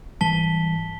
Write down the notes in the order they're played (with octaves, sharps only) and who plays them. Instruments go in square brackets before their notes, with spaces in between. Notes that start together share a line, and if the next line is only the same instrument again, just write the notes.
[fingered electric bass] G#2 E3 G3 [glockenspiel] A5 B6 G7